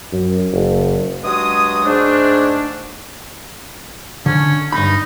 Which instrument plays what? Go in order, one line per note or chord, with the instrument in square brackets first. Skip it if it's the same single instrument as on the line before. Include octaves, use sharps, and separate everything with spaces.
[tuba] F#2
F#1
[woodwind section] G2 F#3 G#3 D#6
G#2 A3 D4
[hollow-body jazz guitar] D3 [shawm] C#4
[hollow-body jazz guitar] G2 B5 [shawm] D#4